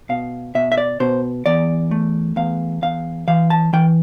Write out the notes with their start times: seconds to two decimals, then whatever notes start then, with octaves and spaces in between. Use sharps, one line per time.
0.09 B2 F5
0.55 B2 E5
0.72 E5
0.77 D5
1.00 B2 C5
1.46 E2 D5
1.91 A3
2.36 E2 F5
2.82 E2 F5
3.28 E3 F5
3.50 A5
3.73 E3 G5